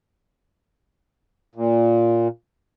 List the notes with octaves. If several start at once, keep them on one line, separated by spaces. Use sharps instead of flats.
A#2